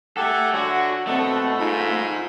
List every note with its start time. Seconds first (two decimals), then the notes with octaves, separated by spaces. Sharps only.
0.17 G4 A4 E5 F#5 G#5
0.54 D3 F#4 C#5 E5 G#5
1.07 B2 A3 C4 A4 D#5 F#5
1.59 G#2 D#4 F4 B5